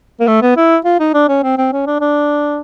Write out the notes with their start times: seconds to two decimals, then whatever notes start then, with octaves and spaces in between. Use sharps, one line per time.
0.20 A#3
0.27 A3
0.42 B3
0.56 E4
0.85 F4
1.00 D#4
1.14 D4
1.28 C#4
1.43 C4
1.58 C4
1.72 C#4
1.87 D4
2.00 D4